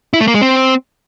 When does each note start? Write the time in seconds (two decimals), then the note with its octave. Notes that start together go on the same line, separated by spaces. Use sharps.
0.13 E4
0.20 A3
0.27 A#3
0.34 G#3
0.41 C4